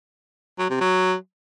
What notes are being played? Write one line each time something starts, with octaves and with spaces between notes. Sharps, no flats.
F#3
C3
F#3